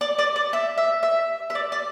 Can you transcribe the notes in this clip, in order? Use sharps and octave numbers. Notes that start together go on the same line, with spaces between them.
D5
D5
D5
E5
E5
E5
E5
D5
D5